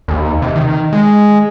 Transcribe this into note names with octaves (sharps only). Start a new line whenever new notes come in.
D#2
C3
D#3
G#3